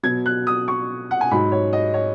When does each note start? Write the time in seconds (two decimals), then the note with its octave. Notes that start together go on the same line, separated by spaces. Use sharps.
0.03 B2 F#3 G#6
0.26 F#6
0.47 D#6
0.68 C#6
1.11 F#5
1.21 G#5
1.31 G#2 F#3 B5
1.52 C#5
1.73 D#5
1.94 C#5